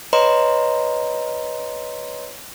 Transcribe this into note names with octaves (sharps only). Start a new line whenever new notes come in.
B4 C#5 D#5 A#5 C6